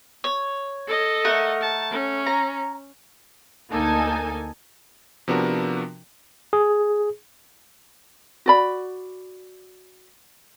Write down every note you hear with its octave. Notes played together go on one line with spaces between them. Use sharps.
C#5
A4 D#5
A3 A#4 F#5
A5
C#4
A#5
D2 A#3 D#4 A4 G#5
C3 F3 B3 D4 F#4 A#4
G#4
F#4 D5 B5